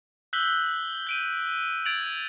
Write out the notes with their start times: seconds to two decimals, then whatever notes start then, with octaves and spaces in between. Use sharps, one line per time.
0.33 E6 F#6 G6 B6 F#7 G7
1.07 G6 D7 D#7
1.85 G#6 A6 D7 F7 F#7